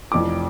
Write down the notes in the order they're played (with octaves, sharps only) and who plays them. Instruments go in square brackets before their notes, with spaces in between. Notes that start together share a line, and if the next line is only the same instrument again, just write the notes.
[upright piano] F1 F2 E3 D6